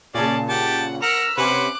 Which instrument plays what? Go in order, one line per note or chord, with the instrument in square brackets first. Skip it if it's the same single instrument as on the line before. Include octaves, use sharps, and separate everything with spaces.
[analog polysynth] A#2 C#3 [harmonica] C#4 D5 [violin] G#4 A5
[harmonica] G4 A5 [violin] F#5
[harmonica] A#4 F#5 [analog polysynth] A#5 B6 [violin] E6 F6
[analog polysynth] C3 C#4 [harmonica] B4 C5 F#5 [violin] D6 F#6